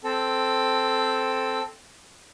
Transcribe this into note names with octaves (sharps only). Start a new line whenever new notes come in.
C4 A4